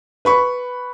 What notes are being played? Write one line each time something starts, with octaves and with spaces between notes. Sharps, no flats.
B4 B5 C#6